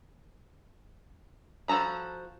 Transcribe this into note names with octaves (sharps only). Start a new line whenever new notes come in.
F3 F#4 A4 A#5 B5